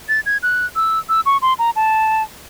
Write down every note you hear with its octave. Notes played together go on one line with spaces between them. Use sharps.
A6
G#6
F#6
E6
E6
C#6
C6
A#5
A5